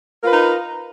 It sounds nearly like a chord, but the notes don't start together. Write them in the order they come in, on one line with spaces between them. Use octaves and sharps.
A#4 F4 B4 D#4